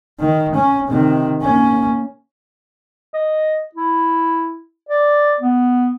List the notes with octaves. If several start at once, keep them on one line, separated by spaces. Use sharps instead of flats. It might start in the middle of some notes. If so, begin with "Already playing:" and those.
D#3
C#4
C3 D#3
A#3 C#4
D#5
E4
D5
B3